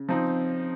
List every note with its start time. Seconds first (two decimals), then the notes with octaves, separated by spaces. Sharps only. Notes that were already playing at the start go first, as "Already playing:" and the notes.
Already playing: C#3
0.09 F3 C4 D#4